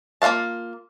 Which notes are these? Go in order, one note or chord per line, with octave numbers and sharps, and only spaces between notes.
A#3 F4 D5 F5 A5